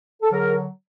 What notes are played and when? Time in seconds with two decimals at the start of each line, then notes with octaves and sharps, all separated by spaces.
0.23 A4
0.31 D3 F#3 G#4 A#4